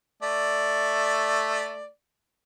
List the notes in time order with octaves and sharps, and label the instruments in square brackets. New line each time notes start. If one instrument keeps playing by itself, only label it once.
[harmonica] A3 D5